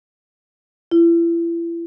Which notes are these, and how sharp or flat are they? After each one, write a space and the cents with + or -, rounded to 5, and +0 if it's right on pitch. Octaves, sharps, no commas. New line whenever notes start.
E4 +35